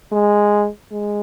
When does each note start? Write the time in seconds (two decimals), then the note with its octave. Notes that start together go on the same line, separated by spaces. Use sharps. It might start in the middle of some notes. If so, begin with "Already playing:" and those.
0.12 G#3
0.92 G#3